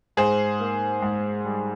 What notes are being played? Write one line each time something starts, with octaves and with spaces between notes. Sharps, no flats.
G#2 G#4 C5
A#3
G#2
G3